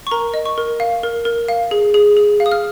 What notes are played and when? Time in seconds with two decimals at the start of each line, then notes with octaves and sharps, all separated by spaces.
0.07 C#6
0.11 A#4 A#5
0.34 D#5
0.46 C#6
0.58 A#4
0.80 F5
1.03 A#4
1.25 A#4
1.48 F5
1.71 G#4
1.94 G#4
2.17 G#4
2.40 F5
2.46 D#6
2.52 F6